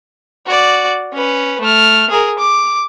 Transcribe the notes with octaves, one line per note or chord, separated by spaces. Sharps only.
F#4 D5
C#4 B4
A3 F6
G#4 A#4
D6